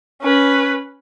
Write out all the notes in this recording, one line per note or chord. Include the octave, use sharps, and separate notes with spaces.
C#4 B4